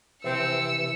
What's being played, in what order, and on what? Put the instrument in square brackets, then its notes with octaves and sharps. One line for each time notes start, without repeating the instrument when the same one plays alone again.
[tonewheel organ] C3 E3 [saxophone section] F3 C4 [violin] E6 C#7